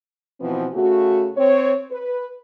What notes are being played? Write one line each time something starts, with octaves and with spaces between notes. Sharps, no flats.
B2 E3 F3 B3 C4
C#3 A3 F#4
C4 C#5
B4